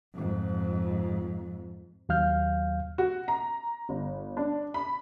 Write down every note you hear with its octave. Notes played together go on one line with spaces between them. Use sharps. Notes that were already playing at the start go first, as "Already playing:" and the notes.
F2 G#2
D#2 F#3 F5 F6 G6
F#4
A#5
G1
D4
B5